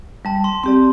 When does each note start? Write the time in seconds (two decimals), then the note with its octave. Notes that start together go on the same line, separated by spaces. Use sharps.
0.25 G3 A5
0.44 C6
0.64 C4 G4 D5 C6